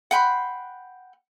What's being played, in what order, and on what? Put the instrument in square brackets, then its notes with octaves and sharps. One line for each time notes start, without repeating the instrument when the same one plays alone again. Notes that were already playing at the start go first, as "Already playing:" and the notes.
[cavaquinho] F#5 G5 B5 C6